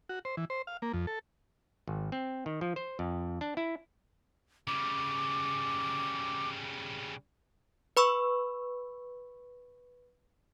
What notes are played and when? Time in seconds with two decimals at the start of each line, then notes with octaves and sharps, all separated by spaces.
0.09 F#4
0.25 C5
0.37 E3
0.50 C5
0.67 F5
0.82 A#3
0.94 F2
1.07 A4
1.88 G#1
2.12 C4
2.46 D#3
2.61 F3
2.76 C5
2.99 F2
3.41 D4
3.57 E4
4.67 C#3 G3 D6
7.97 B4 B5 C#6 E6